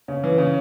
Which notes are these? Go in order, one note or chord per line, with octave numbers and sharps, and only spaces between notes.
C#3
E3
C#3